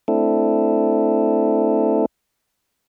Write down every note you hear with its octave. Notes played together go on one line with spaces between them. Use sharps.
A3 C4 D4 E4 A4